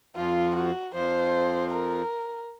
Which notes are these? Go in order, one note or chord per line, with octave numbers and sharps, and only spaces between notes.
F2 F3 F4
F#4
F2 F3 C5
A#4